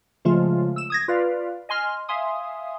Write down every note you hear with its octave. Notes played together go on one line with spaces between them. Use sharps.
C#3 F3 G#3 A3 F4
E6 E7
D#6 G#6 A#6
F4 B4 D5 F5
D#5 G#5 C6 F6
E5 F5 G#5 C6 D#6